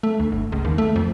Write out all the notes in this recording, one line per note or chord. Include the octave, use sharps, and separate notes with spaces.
A3
D2
G1
C#2
D#2
A3
F2